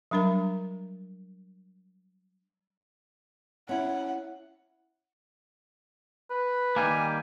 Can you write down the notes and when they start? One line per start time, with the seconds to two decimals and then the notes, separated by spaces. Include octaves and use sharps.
0.11 F#3 G3 D4 A#4 A#5
3.69 C#4 E4 F#5
6.30 B4
6.76 D#3 G3 A#3 G#5